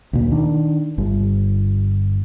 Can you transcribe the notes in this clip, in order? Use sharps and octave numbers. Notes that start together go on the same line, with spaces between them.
D2 A#2
D#3 D4
G1